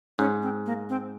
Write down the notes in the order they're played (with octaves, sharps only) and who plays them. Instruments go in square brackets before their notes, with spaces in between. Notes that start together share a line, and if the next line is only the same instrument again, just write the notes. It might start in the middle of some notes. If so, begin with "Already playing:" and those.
[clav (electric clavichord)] G#2 [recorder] C#4
[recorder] C4
A#3
C4